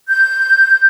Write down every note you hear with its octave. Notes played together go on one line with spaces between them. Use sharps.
G6